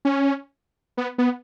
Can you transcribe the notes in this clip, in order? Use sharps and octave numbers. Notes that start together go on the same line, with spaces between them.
C#4
B3
B3